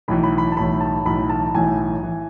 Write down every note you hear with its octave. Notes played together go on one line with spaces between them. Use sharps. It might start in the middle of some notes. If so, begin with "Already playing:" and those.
B1 A2 E3 B5
B5
B5
A5
B1 A2 E3 B5
A5
B1 A2 E3 B5
A5
B1 A2 E3 G#5
E3